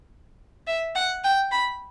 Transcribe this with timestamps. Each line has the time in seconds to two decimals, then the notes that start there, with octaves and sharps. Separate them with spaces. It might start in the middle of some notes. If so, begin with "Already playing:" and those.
0.67 E5
0.95 F#5
1.24 G5
1.51 B5